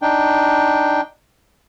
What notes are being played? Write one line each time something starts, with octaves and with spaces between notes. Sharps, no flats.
D4 D#4 G5